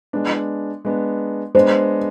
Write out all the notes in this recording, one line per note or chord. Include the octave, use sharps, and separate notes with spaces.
G#3 B3 D4
G#3 B3 D4
G#3 B3 D4 C5